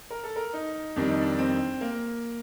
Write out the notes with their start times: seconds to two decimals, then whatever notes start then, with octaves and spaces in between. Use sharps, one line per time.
0.10 A#4
0.24 A4
0.36 A#4
0.53 D#4
0.96 F2 D#3 G3 D4
1.09 D#4
1.21 D4
1.39 C4
1.81 A#3